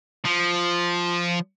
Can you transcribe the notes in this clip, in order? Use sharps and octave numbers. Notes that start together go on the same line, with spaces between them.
F3